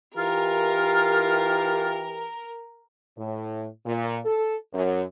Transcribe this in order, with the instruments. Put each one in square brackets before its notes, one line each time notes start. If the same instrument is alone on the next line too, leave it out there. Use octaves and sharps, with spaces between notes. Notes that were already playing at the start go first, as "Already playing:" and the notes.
[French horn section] E3 G4 [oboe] F4 [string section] A#4
[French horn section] A2
A#2
A4
F#2